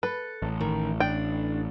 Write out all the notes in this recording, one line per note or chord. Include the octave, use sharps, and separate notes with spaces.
A4 B4
A1
D#3
D4 G5